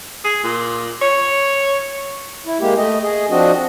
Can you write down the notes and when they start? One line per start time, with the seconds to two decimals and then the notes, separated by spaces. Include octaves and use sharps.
0.24 G#4
0.44 A#2
1.02 C#5
2.46 E4
2.60 G#3 A#3 G4
2.77 A3 D#5
3.02 G#4 D#5
3.30 F3 C4 D4 F#4 D#5